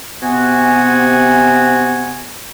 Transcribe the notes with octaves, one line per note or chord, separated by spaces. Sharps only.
C3 B3 F#4 G#5